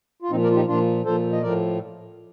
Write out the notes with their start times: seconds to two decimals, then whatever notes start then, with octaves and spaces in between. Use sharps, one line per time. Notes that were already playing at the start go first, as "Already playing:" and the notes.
0.22 F4
0.31 A#2 F3 C4 D#4
0.43 A#4 D5
0.51 F4
0.56 D#4 G4
0.68 A#2 F3 D4 F4
1.05 A#2 F3 A4 C5
1.32 D#5
1.42 A2 F3 A#4 D5